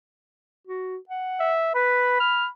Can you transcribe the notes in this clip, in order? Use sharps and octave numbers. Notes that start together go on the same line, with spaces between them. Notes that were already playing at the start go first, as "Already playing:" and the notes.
F#4
F#5
E5
B4 B5
F6